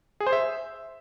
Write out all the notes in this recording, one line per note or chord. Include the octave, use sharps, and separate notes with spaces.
G#4
C5
E5